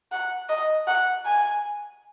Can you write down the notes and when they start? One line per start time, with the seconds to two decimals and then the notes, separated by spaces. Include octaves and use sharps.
0.12 F#5
0.49 D#5
0.87 F#5
1.26 G#5